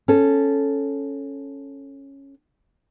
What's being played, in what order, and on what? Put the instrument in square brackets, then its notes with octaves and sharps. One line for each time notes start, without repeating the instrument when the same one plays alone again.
[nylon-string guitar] C#4 A4